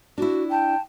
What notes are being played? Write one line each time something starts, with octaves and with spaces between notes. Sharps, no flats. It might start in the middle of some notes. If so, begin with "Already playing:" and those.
D4 E4 F#4
G5 A5